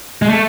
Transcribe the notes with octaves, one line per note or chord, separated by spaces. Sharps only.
G#3
A3